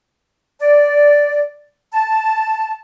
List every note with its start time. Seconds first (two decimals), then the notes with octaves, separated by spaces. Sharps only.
0.59 D5
1.91 A5